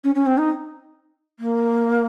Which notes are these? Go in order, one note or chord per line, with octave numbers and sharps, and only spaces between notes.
C#4
C#4
C4
D#4
A#3